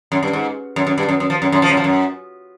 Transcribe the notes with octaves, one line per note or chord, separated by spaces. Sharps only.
F#2
G2
G#2
F#2
F#2
G2
F#2
F#2
F3
F#2
F#2
F3
F#2
F3
F#2